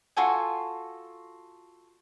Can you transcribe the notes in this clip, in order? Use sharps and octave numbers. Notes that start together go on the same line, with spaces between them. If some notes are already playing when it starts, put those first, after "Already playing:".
F4 F#4 A4 G#5